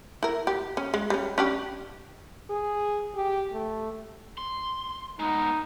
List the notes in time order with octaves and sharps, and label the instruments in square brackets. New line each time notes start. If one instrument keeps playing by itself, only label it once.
[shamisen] E4 A#4
G4
C#4
G#3
G3 C#4
C#4 D4 G4
[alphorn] G#4
G4
A3
[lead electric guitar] C6
[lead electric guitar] G#3 B3 [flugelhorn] D#4